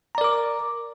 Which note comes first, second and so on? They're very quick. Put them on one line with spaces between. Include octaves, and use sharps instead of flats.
A#5 D5 A#4 D6